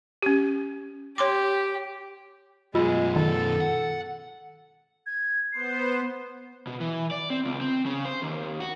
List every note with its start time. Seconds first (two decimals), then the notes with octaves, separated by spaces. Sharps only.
0.22 C#4 G4
1.18 G4 C#5 C6 D6
2.75 F#2 B2 G#3 F4 D#5 E6
3.16 D#3 A4
3.61 F#5
5.06 G#6
5.53 B3 C5 C7
6.67 B2
6.80 E3
7.11 D5
7.30 C4
7.45 C#2
7.61 C4
7.86 C#3
8.05 C5
8.22 D#2
8.60 F#4